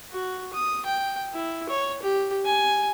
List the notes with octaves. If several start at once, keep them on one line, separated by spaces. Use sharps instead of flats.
F#4
D#6
G5
E4
C#5
G4
G#5